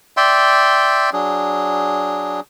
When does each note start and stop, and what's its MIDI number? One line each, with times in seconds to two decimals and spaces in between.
0.17 1.10 74
0.17 1.10 76
0.17 1.10 79
0.17 1.10 84
1.13 2.40 54
1.13 2.40 62
1.13 2.40 68